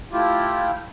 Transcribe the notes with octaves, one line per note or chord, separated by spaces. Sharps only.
A3 E4 F4 G4